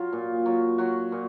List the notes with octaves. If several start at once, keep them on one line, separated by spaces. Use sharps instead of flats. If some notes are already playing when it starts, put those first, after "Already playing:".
Already playing: F#3 F4
A#2
F#3
F#3 F#4
A#2